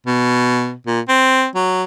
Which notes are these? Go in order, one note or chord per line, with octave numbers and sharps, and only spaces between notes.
B2
A#2
C4
F#3